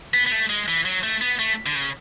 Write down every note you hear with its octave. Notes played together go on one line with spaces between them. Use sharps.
B3
B3
A3
G#3
E3
F#3
A3
B3
A3
D3
C#3